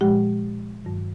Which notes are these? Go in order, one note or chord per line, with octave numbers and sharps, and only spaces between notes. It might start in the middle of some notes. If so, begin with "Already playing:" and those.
A#2 F3 G#3 G4
G2 D#3 F#3